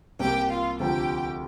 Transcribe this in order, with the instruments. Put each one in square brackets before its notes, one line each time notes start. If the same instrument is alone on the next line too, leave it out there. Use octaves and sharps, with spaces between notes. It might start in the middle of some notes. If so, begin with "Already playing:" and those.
[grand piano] C2 C3 A#3 [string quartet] G4 G5
[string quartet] F4 F5
[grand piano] D2 C3 F3 [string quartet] G4 G5